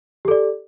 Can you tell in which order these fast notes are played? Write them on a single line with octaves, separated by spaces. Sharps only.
G4 A4 D5